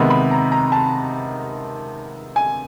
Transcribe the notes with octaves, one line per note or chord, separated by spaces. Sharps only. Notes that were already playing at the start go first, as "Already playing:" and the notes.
Already playing: C3 D#3 G#3 B3 B5
B5
A#5
A#5
A5
G#5